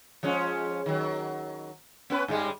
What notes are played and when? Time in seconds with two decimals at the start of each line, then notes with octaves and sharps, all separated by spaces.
0.23 F3 G#3 C#4
0.86 D#3 F#3
2.10 B3 C#4 B4
2.28 G2 G3 G#3